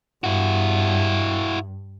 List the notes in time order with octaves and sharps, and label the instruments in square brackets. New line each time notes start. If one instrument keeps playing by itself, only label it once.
[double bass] G2 [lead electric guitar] E4 F#4